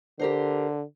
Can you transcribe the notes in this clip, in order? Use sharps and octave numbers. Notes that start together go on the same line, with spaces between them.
D3 G4 A#4 C5